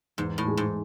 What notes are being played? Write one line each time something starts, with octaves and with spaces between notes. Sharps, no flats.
E2 G#2
A2
G#3
G#2